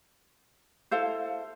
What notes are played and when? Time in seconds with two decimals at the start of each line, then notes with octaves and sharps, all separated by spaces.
0.91 E4 A4 C5 F5